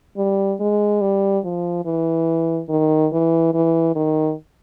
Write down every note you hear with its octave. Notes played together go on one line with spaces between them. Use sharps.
G3
G#3
G3
F3
E3
D#3
E3
E3
D#3